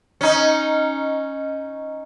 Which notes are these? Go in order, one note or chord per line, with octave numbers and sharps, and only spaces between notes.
C#4 D#4